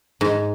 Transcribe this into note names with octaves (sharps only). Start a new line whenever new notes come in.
G#2